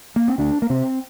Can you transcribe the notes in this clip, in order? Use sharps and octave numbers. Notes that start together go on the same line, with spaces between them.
A#3
C4
D2 D4
A#3
C3 C4